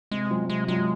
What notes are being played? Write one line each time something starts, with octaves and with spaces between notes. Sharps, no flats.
C3 G#3
F#3 C4 F4
C3 G#3
F#3 G#3 C4 F4